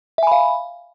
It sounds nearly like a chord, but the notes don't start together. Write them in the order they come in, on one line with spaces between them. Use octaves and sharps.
E5 G#5 B5 F5